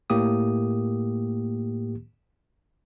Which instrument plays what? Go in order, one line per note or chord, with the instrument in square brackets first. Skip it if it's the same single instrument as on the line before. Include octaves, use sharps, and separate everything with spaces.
[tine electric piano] A2 A#3 G4 D#6